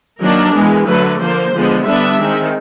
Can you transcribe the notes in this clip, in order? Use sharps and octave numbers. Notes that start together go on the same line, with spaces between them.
D#3 F#3 A#3 D4 A#4
E3 G#3 B3
D3 F#3 A3 B4
D3 F3 A#3 C5
D3 F3 G#3 B3
D3 G3 B3 D4 E5
D#3 G#3 C4